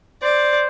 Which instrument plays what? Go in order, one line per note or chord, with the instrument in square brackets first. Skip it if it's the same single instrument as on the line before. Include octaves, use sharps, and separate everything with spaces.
[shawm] C5 [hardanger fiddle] D5